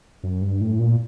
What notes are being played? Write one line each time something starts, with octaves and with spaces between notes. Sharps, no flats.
F#2
G2
A2
A#2